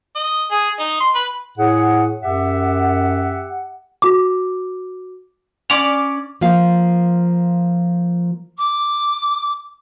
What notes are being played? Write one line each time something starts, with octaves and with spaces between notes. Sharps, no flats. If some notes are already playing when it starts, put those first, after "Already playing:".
D#5
G#4
D#4
C6
B4
A2 G#4 F#5
F#2 G4 E5 F#5
F#4 D6
C#4 D5 D6 F7
F3 A#3 F4 F5
D6